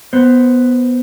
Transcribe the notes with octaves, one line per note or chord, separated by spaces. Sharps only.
B3 C5